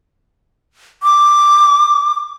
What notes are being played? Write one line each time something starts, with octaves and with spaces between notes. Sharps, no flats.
D6